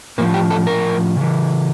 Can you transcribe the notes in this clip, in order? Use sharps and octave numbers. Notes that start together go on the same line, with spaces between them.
A2 F3 A#3
G4
A4
A#4
C#3 E3